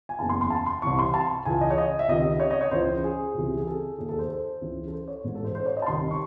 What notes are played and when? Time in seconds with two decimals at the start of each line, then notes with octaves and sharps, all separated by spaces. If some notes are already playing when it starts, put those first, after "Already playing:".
0.09 G#5
0.19 F#1 E2 C#3 E3 A5
0.29 C6
0.41 C6
0.50 A5
0.66 C6
0.82 C2 C3 E3 C#6
0.99 C6
1.14 A5
1.45 C#2 C#3 E3 G#5
1.61 D#5
1.70 C#5
1.78 D#5
1.99 E5
2.08 C#2 C3 D#3 D#5
2.40 C#5
2.50 D#5
2.61 C#5
2.71 C#2 C#3 E3 C5
3.04 G#4
3.34 C#2 C3 E3
3.57 G#4
3.67 A4
3.98 D#2 D#3 G#4
4.09 A4
4.19 C5
4.30 C5
4.61 C#2 C#3 E3
4.88 A4
4.93 C5
5.08 C#5
5.24 A1 G#2 E3
5.35 A4
5.44 C5
5.55 C5
5.66 C#5
5.77 D#5
5.82 A5
5.86 C2 C3 D#3 C6
6.11 C#6